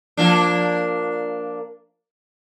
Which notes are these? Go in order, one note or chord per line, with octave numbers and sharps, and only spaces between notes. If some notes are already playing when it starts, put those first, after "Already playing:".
F3 A#3 D4